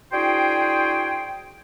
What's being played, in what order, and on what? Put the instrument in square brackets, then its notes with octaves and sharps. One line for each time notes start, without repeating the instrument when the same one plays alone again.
[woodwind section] D4 E4 F#4 G#4 C5 G5